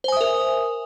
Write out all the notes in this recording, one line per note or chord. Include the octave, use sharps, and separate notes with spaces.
A#4 C5 E5 G#5 D#6